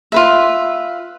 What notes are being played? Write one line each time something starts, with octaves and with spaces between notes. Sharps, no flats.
F4 B4 E5